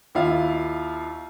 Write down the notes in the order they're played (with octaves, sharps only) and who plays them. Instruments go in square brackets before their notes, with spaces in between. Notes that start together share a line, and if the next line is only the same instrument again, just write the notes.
[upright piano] D#2 E4 F4 F5